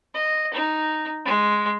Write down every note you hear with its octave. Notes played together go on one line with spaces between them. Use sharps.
D#5
D#4
G#3